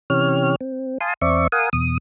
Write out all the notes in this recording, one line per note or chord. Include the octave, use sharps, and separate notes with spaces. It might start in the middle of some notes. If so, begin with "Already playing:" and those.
C3 E3 C#4 G4 C#5 F6
C4
F5 G#5 A5 C6 D#6
E2 C4 D5 E5 C#6
A#4 F5 F#5 G#5 D#6
E2 B2 D#6